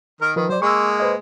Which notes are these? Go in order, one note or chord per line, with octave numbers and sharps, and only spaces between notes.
D#3 A#4
D#3 F3 A#4 B4
F#3 C5 D5
G#3 A#3 C#6 E6
B4 C5 D#5